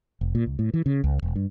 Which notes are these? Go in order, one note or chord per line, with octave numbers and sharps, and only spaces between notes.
F1
A#2
C#2
A2
E3
C#3
C#2
E1
G2